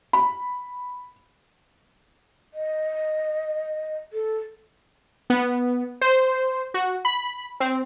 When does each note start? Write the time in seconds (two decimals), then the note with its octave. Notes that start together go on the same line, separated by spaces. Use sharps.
0.13 B5
2.54 D#5
4.13 A4
5.30 B3
6.01 C5
6.74 F#4
7.05 B5
7.60 C4